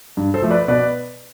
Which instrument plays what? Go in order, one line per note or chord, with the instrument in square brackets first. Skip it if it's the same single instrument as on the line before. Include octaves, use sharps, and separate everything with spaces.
[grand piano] G2
A4 C5
F3 A3
B4 D5
B2 B4 D5